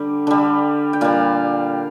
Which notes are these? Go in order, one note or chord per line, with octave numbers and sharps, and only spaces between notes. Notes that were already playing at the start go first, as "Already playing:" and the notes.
Already playing: D3 G3
D3 G3
G5
A#2 G3 F5